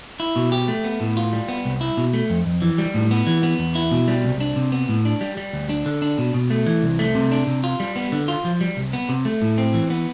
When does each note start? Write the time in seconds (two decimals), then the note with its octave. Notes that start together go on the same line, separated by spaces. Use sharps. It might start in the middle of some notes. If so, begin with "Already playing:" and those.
0.20 E4
0.36 B2
0.52 G4
0.68 A3
0.84 B3
1.00 A2
1.17 F4
1.33 G3
1.49 B3
1.65 C2
1.81 E4
1.97 B2
2.13 A3
2.30 F2
2.46 F2
2.62 E3
2.78 G3
2.94 A2
3.11 B3
3.27 E3
3.43 B3
3.59 E2
3.75 E4
3.91 B2
4.08 G3
4.24 C2
4.40 D4
4.56 C3
4.72 B3
4.89 A2
5.05 D4
5.21 G3
5.37 G3
5.53 D2
5.69 D4
5.86 D3
6.02 D4
6.18 B2
6.34 B2
6.50 A3
6.66 E3
6.83 C2
6.99 A3
7.15 C3
7.31 D4
7.47 C3
7.64 F4
7.80 G3
7.96 B3
8.12 D3
8.28 F4
8.45 F3
8.61 G3
8.77 C2
8.93 B3
9.09 C3
9.25 A3
9.42 A2
9.58 C4
9.74 E3
9.90 B3